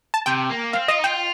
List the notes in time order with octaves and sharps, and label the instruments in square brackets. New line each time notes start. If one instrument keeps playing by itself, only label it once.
[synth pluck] A5
[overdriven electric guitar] C3 [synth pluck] G5
[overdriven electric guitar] A#3
[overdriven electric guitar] C4 [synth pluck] F5
[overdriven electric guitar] F4 [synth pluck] D#5
[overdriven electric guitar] D#4
[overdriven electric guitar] F4 [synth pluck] G5